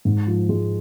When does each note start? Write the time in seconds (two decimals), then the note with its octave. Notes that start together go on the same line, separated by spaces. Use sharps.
0.05 G#2
0.27 F3
0.49 G#3